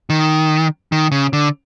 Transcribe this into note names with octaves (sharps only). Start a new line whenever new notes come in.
D#3
D#3
C#3
D3